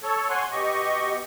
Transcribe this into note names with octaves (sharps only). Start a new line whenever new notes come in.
A4 C#5
C#5 F#5 G#5 C6
B2 G4 D#5 C#6